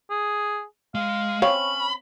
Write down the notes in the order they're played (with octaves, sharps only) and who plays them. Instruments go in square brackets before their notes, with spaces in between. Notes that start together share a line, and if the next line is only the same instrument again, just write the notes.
[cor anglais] G#4
[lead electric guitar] G#3 [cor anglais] F5
[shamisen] C4 C#5 F5 [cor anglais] C#4 [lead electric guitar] B5